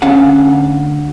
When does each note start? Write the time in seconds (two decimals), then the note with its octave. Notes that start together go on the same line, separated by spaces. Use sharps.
0.02 D2 C#4 F5 F#5